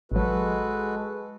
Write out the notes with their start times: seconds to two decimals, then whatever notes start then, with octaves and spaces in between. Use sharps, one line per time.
0.12 A1 F#3 G#3 F#4 A4 B4